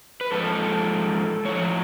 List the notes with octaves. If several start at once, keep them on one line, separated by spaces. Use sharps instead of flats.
B4
G#2 F3 A4
A2 F3 C#5